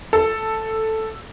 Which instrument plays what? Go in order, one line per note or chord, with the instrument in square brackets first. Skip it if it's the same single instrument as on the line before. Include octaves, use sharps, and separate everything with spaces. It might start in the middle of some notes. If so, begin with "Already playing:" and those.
[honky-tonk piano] A4